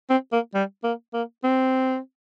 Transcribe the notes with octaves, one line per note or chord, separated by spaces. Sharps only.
C4
A#3
G3
A#3
A#3
C4